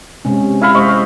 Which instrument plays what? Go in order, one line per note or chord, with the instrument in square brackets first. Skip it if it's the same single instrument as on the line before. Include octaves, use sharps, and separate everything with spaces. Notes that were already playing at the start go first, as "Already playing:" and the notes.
[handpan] C3 G#3 C#4
[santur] E4 F5 B5
[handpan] G#3 C5 D#5 [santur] C#6